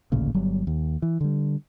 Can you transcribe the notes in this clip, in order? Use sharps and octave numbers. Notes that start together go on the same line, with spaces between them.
A1 D2 A#2 C#3
G1 F#3 G3
D#2
E3
D3 G3